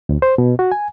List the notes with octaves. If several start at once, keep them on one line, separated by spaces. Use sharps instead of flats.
D2
C5
B2
F#4
G#5